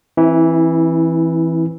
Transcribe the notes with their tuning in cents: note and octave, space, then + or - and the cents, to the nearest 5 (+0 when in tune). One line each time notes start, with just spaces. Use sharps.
E3 +0 C4 +25 E4 -30